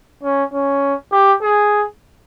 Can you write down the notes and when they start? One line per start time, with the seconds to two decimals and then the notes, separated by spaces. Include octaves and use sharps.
0.23 C#4
0.53 C#4
1.12 G4
1.42 G#4